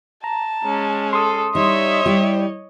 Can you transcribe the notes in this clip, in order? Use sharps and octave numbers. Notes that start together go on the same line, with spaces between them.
A5 A#5
G#3 C#4
A4 C6 D#6
G3 D#4 C#5 D#5 E5
G3 E4 G4